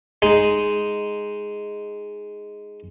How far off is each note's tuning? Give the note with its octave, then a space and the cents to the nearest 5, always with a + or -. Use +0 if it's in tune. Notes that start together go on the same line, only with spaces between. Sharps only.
G#3 +0 D#4 +0